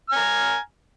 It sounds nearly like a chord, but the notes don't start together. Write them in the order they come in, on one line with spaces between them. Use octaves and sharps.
F6 G#5 A#5